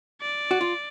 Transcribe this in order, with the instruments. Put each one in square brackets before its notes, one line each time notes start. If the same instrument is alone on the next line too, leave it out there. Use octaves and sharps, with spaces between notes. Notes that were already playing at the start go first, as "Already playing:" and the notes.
[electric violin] D5
[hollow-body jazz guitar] F#4
F4